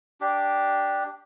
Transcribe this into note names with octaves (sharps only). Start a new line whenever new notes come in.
D4 G4